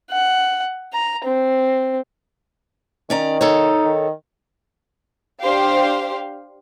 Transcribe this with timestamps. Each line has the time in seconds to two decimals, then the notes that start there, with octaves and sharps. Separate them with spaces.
0.11 F#5
0.94 A#5
1.25 C4
3.10 D#3 C#4 D5 A#5
3.41 D#4 A4 C#5
3.85 D#3
5.41 D4 G4 C5 F5